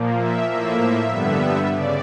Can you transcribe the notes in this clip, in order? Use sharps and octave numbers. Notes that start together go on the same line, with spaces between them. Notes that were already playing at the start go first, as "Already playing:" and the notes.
Already playing: A#2 F3 A#3
E5
A2 F3 A#3 E5
G2 D3 G3 B3
C#3 D5